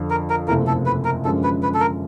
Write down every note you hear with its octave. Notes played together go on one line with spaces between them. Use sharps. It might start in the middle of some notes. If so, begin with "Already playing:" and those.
Already playing: F2 D3 F3
A#4
A#4
F#1 E2 C3 F3 A3 A#4
A4
B4
A#4
F#2 D3 F3 G#3 C#4 A4
B4
B4
A4
A#4